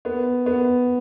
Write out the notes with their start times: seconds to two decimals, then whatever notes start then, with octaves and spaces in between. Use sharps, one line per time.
0.05 B3
0.46 B3